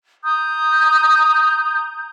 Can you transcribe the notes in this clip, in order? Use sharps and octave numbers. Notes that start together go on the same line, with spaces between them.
A#5 D#6 G6